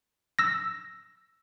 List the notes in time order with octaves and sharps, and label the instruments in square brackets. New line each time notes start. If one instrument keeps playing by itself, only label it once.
[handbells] E6 A#6